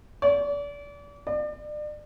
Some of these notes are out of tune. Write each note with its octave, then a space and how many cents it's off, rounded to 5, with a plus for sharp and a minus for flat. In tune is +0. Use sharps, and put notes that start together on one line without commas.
D5 -35
D5 +35